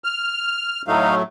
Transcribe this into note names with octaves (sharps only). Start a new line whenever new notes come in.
F6
A2 F#3 A3 D#4 F5